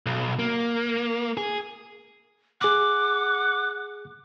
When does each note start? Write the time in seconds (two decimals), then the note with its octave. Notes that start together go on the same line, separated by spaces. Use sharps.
0.06 B1
0.39 A#3
1.37 G#4
2.61 G#4 F#5 D6 F#6